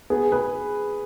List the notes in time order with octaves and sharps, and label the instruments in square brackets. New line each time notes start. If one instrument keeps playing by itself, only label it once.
[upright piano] B3 [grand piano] G#4
[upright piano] G#4 [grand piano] B4